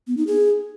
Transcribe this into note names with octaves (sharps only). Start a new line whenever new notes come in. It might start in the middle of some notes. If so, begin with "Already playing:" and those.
B3
D#4
G#4